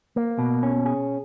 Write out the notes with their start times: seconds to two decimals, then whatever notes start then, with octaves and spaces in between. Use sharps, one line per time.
0.16 A#3
0.39 B2
0.63 C#4
0.86 G#4